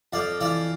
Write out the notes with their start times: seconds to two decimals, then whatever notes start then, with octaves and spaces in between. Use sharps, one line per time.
0.13 F2 D5 F5
0.40 E3 D5 F5